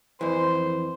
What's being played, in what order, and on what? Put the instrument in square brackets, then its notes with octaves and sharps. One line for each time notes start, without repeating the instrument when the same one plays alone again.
[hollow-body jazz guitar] F2 E3 [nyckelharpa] C5